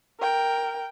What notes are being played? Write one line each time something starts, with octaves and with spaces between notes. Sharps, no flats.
A#4 G5